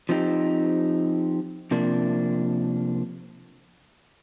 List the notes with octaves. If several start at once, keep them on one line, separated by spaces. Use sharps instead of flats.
F3 C4 D#4 G4
C3 F3 A#3 D4